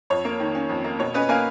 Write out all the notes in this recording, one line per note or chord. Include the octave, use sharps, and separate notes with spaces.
F2 C#5
A#3
D#3
C#4
F2
A#3
B2 C#5
C#4 B4 D#5
A#3 F5 G#5